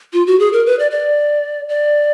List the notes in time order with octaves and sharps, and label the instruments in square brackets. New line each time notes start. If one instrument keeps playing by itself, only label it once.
[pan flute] F4
F#4
G#4
A#4
B4
D5
D5
D5